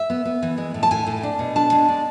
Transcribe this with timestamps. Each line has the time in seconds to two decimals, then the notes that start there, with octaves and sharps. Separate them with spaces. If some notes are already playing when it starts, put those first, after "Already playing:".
Already playing: E5
0.10 B3
0.25 B3
0.43 E3
0.58 G#3
0.74 A2
0.83 A5
0.91 A2 G#5
1.07 A2
1.23 D4
1.39 B2
1.56 D4 A5
1.72 G#3
1.88 D4